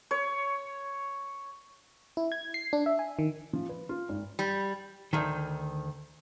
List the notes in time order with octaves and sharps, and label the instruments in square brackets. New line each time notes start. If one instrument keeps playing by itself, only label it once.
[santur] C#5
[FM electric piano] E4
G#6
C7
D4
E5
G#5
D#3
[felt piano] F3
B4
F4
G#1
[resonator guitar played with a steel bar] G3
[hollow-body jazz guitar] D2 D#3